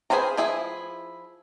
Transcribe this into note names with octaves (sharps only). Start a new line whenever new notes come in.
G#4 B4 C5 F5 A#5
F3 E4 G#4